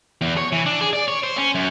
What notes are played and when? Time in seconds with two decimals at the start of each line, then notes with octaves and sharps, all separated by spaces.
0.21 E2
0.37 C#5
0.52 E3
0.66 D4
0.81 G#4
0.93 D5
1.08 C#5
1.23 C5
1.38 C#4
1.55 F#2